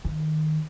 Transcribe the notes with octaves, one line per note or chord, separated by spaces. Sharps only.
D#3